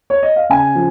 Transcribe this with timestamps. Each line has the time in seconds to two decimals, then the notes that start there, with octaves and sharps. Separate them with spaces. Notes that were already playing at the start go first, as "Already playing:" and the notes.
0.10 C#5
0.23 D#5
0.36 F5
0.49 C#3 G#5
0.75 F3